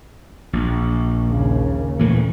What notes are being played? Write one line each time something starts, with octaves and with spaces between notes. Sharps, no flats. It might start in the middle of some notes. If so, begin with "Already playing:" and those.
A#1
D#2 C#3
A#2 E3 A3